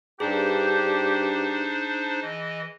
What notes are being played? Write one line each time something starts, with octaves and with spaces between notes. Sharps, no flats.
G2 D4 D#4 G4 G#4 C5
E3 D#5